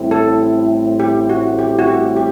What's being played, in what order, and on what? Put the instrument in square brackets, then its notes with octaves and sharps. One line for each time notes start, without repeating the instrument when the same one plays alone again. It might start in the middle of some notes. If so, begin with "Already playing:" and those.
Already playing: [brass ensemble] A1 A2 G3 C4 E4
[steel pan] A4
G4
F#4
G4
F#4
G4
G4